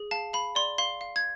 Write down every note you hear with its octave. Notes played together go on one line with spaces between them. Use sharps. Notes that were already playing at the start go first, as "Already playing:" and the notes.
Already playing: G#4
F5 A5
F5 B5
D5 C6
F5 C6
F5
G#6